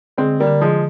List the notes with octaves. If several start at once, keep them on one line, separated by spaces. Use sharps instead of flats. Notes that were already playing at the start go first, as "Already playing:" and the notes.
D3 G#3 C4
G3 A#3
D3
F3 G#3